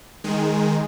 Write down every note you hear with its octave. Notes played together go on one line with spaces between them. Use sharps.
D#3 G#3